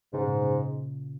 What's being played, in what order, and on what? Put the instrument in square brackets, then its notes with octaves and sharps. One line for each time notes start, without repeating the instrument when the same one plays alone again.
[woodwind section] G#2 [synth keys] C#3
[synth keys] A#2
C#3